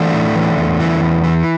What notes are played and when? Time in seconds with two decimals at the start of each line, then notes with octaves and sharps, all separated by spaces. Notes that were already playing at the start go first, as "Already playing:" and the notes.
Already playing: E3 A3 D4
0.14 A2
0.35 E3
0.58 E2
0.80 E3
1.01 E2
1.24 E3